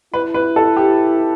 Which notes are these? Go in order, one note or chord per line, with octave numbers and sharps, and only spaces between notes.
E4 B4
B4
A4
G4